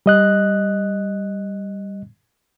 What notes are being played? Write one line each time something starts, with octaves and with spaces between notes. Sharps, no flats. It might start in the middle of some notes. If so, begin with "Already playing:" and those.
G3 D#5 F#6